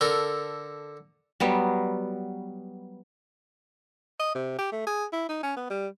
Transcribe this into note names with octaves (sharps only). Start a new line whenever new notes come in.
D3 A4 A#4
F#3 G3 B3
D#5
C3
G4
A3
G#4
E4
D#4
C#4
B3
G3